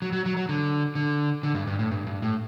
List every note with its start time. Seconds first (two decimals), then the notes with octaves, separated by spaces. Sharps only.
0.02 F#3
0.13 F#3
0.26 F#3
0.37 F#3
0.49 D3
0.95 D3
1.43 D3
1.55 G2
1.67 G2
1.79 A2
1.91 G2
2.07 G2
2.22 A2